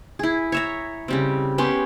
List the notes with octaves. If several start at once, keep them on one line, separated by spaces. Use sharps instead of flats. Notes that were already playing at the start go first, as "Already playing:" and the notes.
E4 G#4
C#5 E5 A#5
C#3 G3 C4
B3 C#4 G4 C6